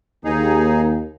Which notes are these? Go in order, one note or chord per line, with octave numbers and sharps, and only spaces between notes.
D#2 D#4 G#4